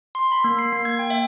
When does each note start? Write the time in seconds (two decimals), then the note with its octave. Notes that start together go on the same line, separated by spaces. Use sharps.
0.15 C6
0.32 B5
0.44 A#3
0.59 C7
0.73 A#3
0.85 G#6
0.99 G5
1.10 E5